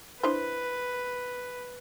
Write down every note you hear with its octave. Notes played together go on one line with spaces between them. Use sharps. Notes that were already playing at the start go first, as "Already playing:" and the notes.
D4 E4 B4 C5